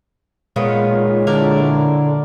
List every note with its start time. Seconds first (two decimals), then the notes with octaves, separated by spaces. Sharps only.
0.56 A#2 D#3 G#3 B3 F4 C#5
1.27 D3 D4 E4 A#4